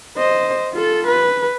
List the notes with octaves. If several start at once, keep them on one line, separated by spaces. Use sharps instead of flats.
C5 D#5
F4 A4
B4